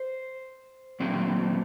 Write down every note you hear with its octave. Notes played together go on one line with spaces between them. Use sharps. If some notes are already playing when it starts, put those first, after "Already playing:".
Already playing: C5
A#2 F#3 A3 C4